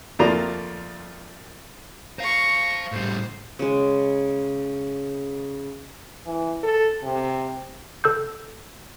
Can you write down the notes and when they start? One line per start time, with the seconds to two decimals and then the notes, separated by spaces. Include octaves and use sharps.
0.19 F2 A3 A#3 F4 D5 A#5
2.19 C5 F5 A#5 C#6
2.92 A2 G3 C5
3.59 C#3 G#3
6.26 E3
6.63 A4
7.04 C3
8.04 A4 E6 G6